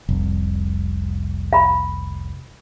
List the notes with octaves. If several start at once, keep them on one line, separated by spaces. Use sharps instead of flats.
F1 C2
F5 A#5 B5